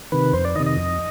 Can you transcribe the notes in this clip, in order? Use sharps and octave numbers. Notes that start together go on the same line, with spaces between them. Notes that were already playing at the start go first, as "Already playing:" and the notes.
C3 D#3 B4
F2 C5
D5
C3 D#3 D#5
D#5
F2